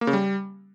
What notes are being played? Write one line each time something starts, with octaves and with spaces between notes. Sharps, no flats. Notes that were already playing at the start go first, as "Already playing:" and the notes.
A#3
C#3
G3